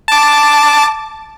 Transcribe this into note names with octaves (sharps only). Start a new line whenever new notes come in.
A5 D6